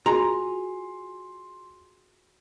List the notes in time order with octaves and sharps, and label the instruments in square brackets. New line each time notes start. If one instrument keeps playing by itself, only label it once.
[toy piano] F4 F#4 [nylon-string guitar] G#4 [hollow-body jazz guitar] A#5 [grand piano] C6